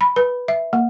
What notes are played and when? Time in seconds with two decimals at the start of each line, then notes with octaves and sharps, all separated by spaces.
0.01 B5
0.16 B4
0.48 E5
0.73 A#3